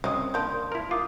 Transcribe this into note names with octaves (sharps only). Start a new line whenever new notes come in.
C2 F#3 C4 C#4 D#5 D#6
D#3 A#3 D4 F5 C6 G6
E4 A#4
F4 D6 D#6